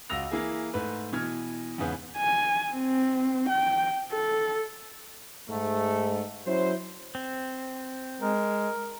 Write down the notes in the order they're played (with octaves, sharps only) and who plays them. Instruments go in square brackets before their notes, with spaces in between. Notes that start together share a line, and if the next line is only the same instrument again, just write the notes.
[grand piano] C#2 F#4 E6 A#6 F7
E3 A#3 E4 G#4
G#2 A3 B4
B2 E3 F6 G#6
E2 G#2 C#3 B3
[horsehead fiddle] G#5
C4
G5
A4
[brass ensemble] G#2 A3
F#3 C#4 E4 C5
[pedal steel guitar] C4
[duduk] G#3 [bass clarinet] A#4